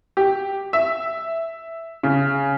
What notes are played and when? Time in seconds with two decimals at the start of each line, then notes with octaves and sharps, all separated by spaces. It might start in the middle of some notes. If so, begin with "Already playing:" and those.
0.17 G4
0.73 E5
2.03 C#3